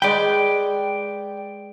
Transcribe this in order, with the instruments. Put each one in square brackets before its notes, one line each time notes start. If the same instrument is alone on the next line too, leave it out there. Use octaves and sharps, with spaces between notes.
[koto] G#3 B4 [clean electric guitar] D5 G5